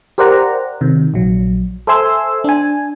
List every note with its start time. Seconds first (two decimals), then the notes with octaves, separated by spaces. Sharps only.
0.18 G4 A#4 C5 D5 F#5 A#5
0.81 C3 D#3
1.14 A#1 F#3
1.87 A4 C5 E5 G#5 C6 E6
2.44 D4 G#5